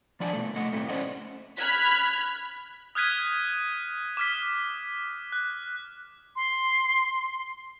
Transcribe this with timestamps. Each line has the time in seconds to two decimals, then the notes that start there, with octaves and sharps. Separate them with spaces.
0.20 F3 D4 D5 F#5 G#5 A5
0.33 B2 A3
0.56 A3 D#5 F#5
0.73 A2 A3 C4
0.89 C#4 C5 D5 D#5 F#5
1.57 B5 F6 F#6 G#6 B6
2.95 D#6 F6 F#6 G#6 B6 D#7
4.17 D6 F6 B6
5.32 F#6
6.36 C6